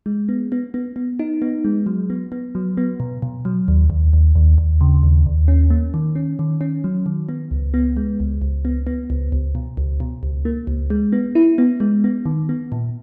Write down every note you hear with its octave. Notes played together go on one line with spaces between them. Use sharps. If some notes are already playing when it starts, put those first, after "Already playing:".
G#3
B3
B3
B3
B3
D#4
B3
G#3
F#3
B3
B3
F#3
B3
B2
B2
F#3
D#2
D#2
D#2
D#2
D#2
C#3
D#2
D#2
C#4
A#3
D#3
C#4
D#3
C#4
F#3
D#3
B3
C#2
B3
G#3
C#2
C#2
B3
B3
C#2
C#2
B2
C#2
B2
C#2
A#3
C#2
G#3
B3
E4
B3
G#3
B3
D#3
B3
A#2